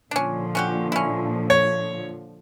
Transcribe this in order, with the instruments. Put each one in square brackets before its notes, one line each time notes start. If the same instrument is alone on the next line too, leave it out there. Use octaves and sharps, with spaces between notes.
[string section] A#2 D3 F3 [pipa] C#4 D4
[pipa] C#4 F#4 G4
C#4 E4
[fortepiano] C#5